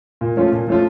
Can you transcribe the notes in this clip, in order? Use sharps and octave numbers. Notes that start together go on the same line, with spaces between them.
A#2
F3 A3 C#4 F4
A#2
F3 A3 C#4 F4